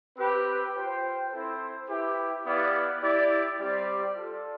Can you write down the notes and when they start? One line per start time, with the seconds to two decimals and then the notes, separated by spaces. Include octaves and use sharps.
0.17 C4 G4 B4
0.74 F4 C5 G5
1.31 C4 E4 A4 C5
1.88 E4 G4 B4 E5 G5
2.45 B3 E4 G4 D5 F5
3.02 E4 G4 D5
3.59 G3 C4 G4 D5
4.16 F4 A4 D5